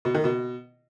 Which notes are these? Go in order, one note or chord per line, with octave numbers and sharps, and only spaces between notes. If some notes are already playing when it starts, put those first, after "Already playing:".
B2
D#3
B2